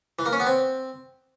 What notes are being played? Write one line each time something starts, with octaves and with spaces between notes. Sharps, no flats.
E3
A#3
C#4
B3
C4